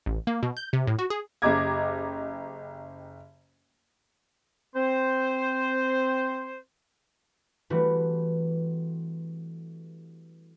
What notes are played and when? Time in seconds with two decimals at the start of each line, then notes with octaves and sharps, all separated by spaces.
0.06 A1
0.27 A#3
0.43 B2
0.57 G6
0.73 C3
0.87 A2
0.99 F#4
1.10 G#4
1.42 F#1 G4 D#5 A#5 D6 G#6
4.76 C4 C5
7.70 E3 G3 A3 C4 F#4 B4